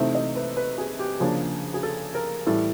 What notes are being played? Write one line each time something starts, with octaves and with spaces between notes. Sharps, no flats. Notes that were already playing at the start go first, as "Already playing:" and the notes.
Already playing: C3 E3 A3 C4 D#4 E5
D#5
B4
B4
G#4
G4
C#3 F3 A#3 D4 G#4
G#4
A4
A#4
A2 E3 G3 A4